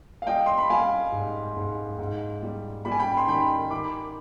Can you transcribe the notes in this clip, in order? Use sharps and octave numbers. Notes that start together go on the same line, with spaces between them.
F5
G3 D#5 G5
C6
B5
G3 F5 G#5
G#2
G#2
G#2
G3
G3 B5
G#5
G5 B5
C6
D#3 G5 B5
D#3 B5 D6